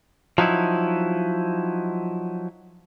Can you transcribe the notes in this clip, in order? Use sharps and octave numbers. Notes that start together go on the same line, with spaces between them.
F3 F#3 D#4 E4